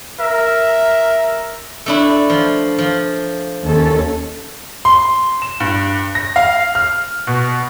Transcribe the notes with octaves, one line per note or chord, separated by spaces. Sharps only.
A#4 E5
A3 D4 E4
F3
F3
D#2 C#4 A4
C6
E7
G2
A#6
F5
F6
B2